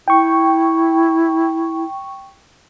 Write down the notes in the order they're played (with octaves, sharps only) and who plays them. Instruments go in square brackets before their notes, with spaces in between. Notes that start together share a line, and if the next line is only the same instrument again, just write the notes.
[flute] E4 [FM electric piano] G5 C#6